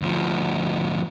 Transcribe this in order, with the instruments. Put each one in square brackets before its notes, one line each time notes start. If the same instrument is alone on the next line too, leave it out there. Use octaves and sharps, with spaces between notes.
[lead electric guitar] D2 F3